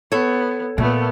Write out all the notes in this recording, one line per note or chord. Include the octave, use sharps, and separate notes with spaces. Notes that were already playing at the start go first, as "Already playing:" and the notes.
B3 A4 C#5
A#2 A3 B3